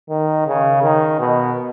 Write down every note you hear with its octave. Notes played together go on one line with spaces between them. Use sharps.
D#3
C#3
D#3
B2